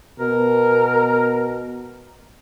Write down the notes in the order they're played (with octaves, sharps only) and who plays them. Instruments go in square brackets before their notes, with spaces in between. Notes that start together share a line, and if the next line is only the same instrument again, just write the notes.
[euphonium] B2 [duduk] A#4